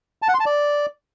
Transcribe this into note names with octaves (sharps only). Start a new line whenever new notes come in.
A5
F#5
C6
A5
D5